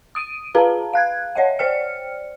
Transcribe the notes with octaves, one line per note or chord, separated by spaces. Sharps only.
D#6 D7 D#7
F4 G#4 B4 F5 A5 A#5
F5 F#6 G#6
C#5 D#5 E5 F#5
C5 D5 G5 F6 C#7